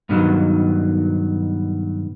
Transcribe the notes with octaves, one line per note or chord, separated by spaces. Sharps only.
G2 B2 D#3 F#3